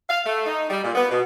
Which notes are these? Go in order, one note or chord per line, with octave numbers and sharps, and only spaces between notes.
F5
A3
D#4
G3
A#2
B3
B2